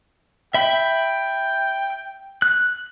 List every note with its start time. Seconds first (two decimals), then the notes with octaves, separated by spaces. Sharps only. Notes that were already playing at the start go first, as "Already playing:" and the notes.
0.54 E5 G5 B5
2.42 F#6